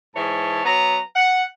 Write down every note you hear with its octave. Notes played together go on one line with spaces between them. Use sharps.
G#2 E3 C#5 A5
F#3 B3 A#5
F#5